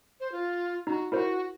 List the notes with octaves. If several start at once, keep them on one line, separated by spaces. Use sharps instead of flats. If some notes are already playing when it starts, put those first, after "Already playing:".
C5
F4
D#4 F#4 A#5
E4 F#4 A#4 C5